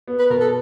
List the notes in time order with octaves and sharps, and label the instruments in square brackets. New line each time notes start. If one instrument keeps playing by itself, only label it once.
[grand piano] B3
[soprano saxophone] B4
[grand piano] B2 [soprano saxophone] A#4
[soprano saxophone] A4